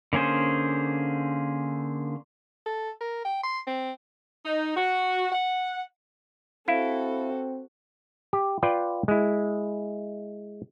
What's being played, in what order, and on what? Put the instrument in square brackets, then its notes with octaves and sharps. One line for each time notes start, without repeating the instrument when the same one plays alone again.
[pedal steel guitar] D3 A#3 C#4 G#4 C5
[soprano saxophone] A4
A#4
G5
C6
C4
[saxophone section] D#4
F#4
F#5
[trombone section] C4 [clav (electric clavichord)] E4 [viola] F#4 A4 [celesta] F5
[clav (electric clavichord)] G4
F4 B4 D5 G5
G#3 E4